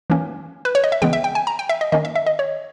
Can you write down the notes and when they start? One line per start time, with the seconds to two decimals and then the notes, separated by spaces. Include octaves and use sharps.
0.10 E3 A#3 C#4
0.65 B4
0.75 C#5
0.84 D#5
0.92 E5
1.02 C#3 E3 G#3 B3 G5
1.13 E5
1.24 G5
1.35 G#5
1.47 A#5
1.59 G5
1.69 E5
1.81 D#5
1.92 D#3 A#3 C#4 D#5
2.05 E5
2.15 E5
2.26 D#5
2.39 C#5